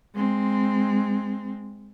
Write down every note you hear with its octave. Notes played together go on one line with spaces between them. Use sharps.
G#3 C4